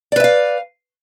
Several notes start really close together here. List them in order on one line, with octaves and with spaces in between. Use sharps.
D5 B4 E5 F5